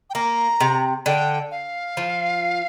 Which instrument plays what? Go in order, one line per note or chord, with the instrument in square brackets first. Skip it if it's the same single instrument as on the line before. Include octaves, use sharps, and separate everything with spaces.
[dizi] G5
[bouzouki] A#3 [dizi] A#5
[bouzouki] C3
[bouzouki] D3 [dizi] G5
[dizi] F5
[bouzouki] F3